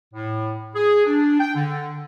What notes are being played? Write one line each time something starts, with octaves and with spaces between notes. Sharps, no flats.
A2
G#4
D4
G5
D3